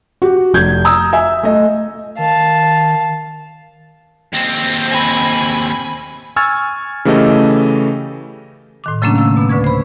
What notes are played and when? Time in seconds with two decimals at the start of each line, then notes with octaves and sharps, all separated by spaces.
0.22 F#4 G4
0.54 F1 G6 G#6
0.85 A#5 D#6 E6
1.13 E5 G#5
1.43 A3 D#5
2.18 D#3 F5 A5
4.33 D#2 C4
4.90 G#5 B5
6.36 G#5 C#6 E6 F6 G#6 A6
7.05 C#3 E3 A3 G4 A4 D#5
8.84 A2 D#3 D6
9.02 C#3 F#3 A3 A#3 C#4 D4
9.16 F5 E6
9.37 B2 B3
9.49 D2 D3 B4 C#6 G#6
9.64 C5 B5